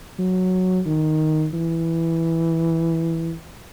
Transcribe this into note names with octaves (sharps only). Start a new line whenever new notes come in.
F#3
D#3
E3